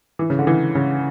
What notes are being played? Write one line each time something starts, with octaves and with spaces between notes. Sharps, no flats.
E3
C#3
D3
E3
C#3